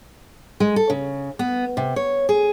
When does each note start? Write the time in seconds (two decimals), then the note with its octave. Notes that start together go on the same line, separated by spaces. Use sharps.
0.60 G#3
0.76 A4
0.90 C#3
1.39 B3
1.77 C3
1.96 C#5
2.29 G#4